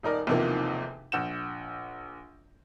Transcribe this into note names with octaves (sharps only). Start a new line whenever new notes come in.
D#1 D#4 A#4 D5
B1 E2 C3 D#3 F3 A#3
A#1 F#5 G6 E7